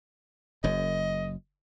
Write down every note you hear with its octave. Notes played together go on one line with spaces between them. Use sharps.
F#1 F#2 D#5